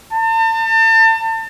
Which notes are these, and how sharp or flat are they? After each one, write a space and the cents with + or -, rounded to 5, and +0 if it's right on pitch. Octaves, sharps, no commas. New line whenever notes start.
A5 +35